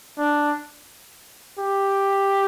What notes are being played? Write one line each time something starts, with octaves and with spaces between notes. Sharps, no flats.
D4
G4